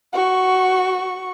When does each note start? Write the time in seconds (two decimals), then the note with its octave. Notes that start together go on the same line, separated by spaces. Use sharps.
0.13 F#4 C#6